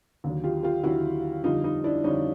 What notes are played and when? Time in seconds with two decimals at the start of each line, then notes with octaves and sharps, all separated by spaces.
0.24 D#2 D3 F#3
0.44 F4 G4
0.63 F4 G4
0.83 D#2 D3 F#3 E4 F#4
1.43 F2 D3 G3 D#4 F4
1.63 D#4 F4
1.84 D4 E4
2.04 F2 D3 G3 C#4 D#4